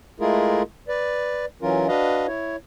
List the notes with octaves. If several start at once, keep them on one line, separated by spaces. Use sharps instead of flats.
G#3 A3 E4 F4 G#4 A#4
B4 D5
E3 F#3 C#4 F4 A#4
D4 F#4 B4 D#5 F5
E4 C#5